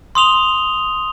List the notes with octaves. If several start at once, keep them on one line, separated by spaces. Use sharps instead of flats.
C6 D#6 F7 G7